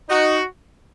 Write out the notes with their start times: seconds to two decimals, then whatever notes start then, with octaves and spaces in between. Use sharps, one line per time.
0.09 D#4 F#4